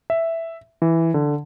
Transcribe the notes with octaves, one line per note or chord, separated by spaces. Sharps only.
E5
E3
D3